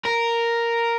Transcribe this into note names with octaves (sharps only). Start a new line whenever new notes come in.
A#4